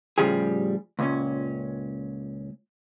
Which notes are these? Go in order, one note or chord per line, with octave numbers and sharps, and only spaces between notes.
A2 C#3 F3 G3 G4 G#4
C#2 A#2 C#4